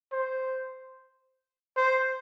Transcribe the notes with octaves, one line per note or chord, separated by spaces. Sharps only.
C5
C5